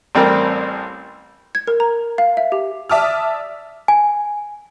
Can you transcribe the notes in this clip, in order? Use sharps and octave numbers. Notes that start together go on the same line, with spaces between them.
A1 G3 C4 A#4
G#6
A#4
A#5
F5
E5
G4
D5 E5 A5 D6 D#6 F6
G#5